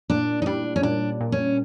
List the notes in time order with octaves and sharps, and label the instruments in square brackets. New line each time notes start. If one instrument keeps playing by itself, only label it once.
[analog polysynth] A#2 [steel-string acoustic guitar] D4
[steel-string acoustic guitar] D#4
[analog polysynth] G3 [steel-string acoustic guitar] D4
[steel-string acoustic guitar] C#4
[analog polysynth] A#2 [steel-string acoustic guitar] D4
[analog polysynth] A#2
[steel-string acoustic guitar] C#4